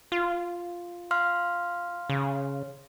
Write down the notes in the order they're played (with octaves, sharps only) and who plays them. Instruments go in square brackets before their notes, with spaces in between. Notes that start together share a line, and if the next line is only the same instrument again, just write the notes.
[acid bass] F4
[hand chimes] F5 C6 F6
[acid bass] C#3